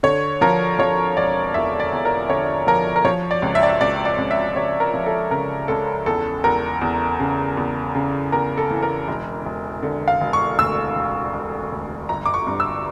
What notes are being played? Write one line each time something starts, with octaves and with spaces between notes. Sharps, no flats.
D3 C#5
F3 A#4
F3 C#5
E1 D5
E2 E5
D5
E2
A#4
D3 C#5
F3 A#4
A#4
F3 C#5
D5
C#2
E5
D5
E5
C#2 D5
D5
C#2
E5
C#2 C#5
A#4
F3
A4
C#3 A#4
C#2 A4
E2 A4
E2 A#4
E2
C#3
E2
C#3
E2 A#4
A4
E3
A#4
E1
E1
D3
F5
E1
C#6
D2 E6
E1
E1
D2
G1 A#5
D6
C#6
G2
E6